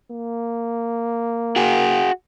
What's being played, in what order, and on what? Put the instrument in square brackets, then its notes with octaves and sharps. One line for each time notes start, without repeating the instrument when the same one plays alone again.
[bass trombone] A#3
[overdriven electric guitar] F#4 G#4